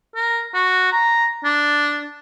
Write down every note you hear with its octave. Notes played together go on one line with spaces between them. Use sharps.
A#4
F#4
A#5
D4